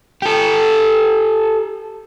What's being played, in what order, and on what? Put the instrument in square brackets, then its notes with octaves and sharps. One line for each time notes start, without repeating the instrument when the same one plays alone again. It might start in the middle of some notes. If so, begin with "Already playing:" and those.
[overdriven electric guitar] G4 A4